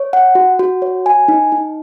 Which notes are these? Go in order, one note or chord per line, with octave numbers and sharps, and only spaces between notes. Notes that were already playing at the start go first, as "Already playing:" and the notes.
Already playing: C#5
F#5
F#4
F#4
C#5
G#5
D#4
D#4